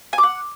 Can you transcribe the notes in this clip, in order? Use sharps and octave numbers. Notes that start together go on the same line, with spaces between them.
G#5
D6
F#5